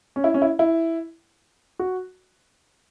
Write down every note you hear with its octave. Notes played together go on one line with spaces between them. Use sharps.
C#4
E4
C#4
E4
E4
F#4